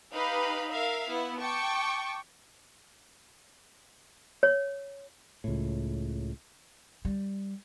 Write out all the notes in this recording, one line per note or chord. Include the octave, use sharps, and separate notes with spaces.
D#4 G4 B4 F5 B5
A#4 E5 F5
B3 E4
G5 A5 C#6 D6
C#5
C#2 A2
G3